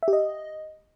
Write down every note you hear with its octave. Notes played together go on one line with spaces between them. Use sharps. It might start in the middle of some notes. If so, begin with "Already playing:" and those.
E5
G4
D#5